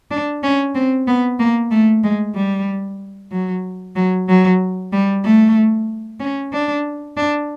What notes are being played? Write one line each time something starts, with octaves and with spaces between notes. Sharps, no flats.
D4
C#4
C4
B3
A#3
A3
G#3
G3
F#3
F#3
F#3
G3
A3
C#4
D4
D4